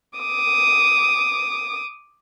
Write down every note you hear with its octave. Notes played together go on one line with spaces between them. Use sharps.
D6 D#6